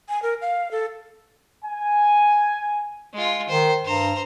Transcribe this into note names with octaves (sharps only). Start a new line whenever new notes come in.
G#5
A#4
F5
A4
G#5
G#3 F4
D#3 C5
G2 C5 A#5